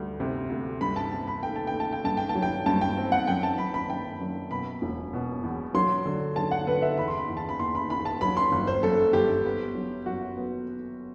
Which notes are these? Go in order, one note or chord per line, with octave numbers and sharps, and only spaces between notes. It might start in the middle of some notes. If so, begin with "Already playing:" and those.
Already playing: D2 G3
C3
D2
G2 B5
A5
C4 A5
B5
A3 G5
A5
G5
A3
A5
G5
G2 A5
G5
A5
F#3
G5
G2 A5
G5
C4
F#5
F#2 G5
A5
F#2 B5
B5
F#2 G5
F#2
B2 B5
E1
B2
E2
F#3 C6
D3
F#3 A5
F#5
D3 B4
E5
E2 B5
C6
B5
E2
A5
B5
E2 C6
B5
E2 B5
A5
F#3 B5
C6
G1
C5
F#2 A4
G1 G4
B3
F#3
F#2 F#4
B3